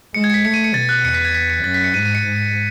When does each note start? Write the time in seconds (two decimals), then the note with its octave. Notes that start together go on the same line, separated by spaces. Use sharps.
0.14 G#3 C#7
0.24 G#6
0.30 C#7
0.34 B6
0.45 A3 C#7
0.54 D#7
0.64 C#7
0.74 B2 A6
0.89 F#6
1.04 E2 C#7
1.14 B6
1.25 G#6
1.35 B6
1.50 C#7
1.64 F#2 A6
1.74 B6
1.84 C#7
1.94 G#2 D#7
2.05 D#7
2.15 C#7
2.25 G#2